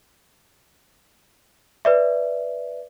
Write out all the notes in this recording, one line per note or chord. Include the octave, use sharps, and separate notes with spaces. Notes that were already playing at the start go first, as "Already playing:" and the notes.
B4 D5 E5